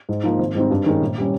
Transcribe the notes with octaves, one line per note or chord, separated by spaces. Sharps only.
G#2
F3 A#3 D#4
G#1
G#2 G3 C4 D#4
G2
D#3 G#3 C#4
A#1
G3 C#4